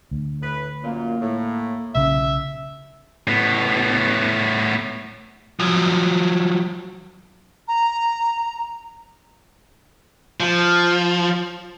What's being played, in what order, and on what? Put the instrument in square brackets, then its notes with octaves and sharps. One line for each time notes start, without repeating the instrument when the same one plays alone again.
[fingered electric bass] D2
[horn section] A2 B4
[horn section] F#2 A#2 [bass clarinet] A#3
[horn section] A2
[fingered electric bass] B1 C#3 [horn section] E5
[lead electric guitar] A2 B3
[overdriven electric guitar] F3 F#3
[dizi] A#5
[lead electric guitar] F3